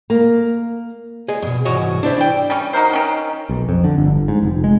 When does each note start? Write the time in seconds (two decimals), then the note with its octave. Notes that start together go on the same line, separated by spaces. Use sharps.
0.10 A#3
1.28 G#4 D#5
1.42 F2 B2
1.65 C2 G#2 E3 F#4 C#5 D#5
2.03 D4 E4 C5 E5
2.17 D5 G5
2.50 G3 C#4
2.73 D#4 F#4 A#4 C5
2.93 D#3 C#4
3.49 B1
3.69 F2
3.84 D3
3.98 G1
4.28 G#2
4.43 F1
4.64 G#3